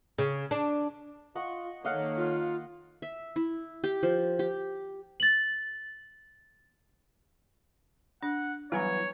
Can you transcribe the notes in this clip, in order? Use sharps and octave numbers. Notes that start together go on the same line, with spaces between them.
C#3
D4
F4 D#5 F#5 C#6
D#3 A#3 A4 C#5 D#5 F5 F#5
F4
E5
E4
G4
F3
G4
A6 F#7
D4 F#5
E3 F#3 G3 B3 C#5 G#5 A#5